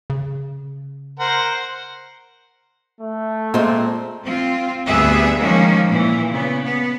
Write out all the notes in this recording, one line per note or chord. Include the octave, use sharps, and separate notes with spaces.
C#3
A#4 C5 F#5
A3
A#2 G#3 C4
C4 F4
D2 G3 B3 G#4 E5
D#3 F3 G#3 A#3 C#4
A#2 E3
C#3 B3
B3